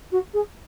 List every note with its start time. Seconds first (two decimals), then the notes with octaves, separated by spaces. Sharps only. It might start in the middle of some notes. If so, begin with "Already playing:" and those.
0.12 F#4
0.33 G#4